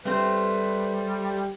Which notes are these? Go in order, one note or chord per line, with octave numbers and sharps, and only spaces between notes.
G3 A3 C4 B4 C5